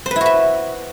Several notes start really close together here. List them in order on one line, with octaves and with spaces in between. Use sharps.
C5 B4 E4 F#4 E5